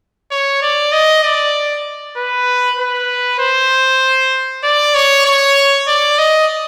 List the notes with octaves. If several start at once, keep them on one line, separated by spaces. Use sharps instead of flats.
C#5
D5
D#5
D5
B4
B4
C5
D5
C#5
C#5
D5
D#5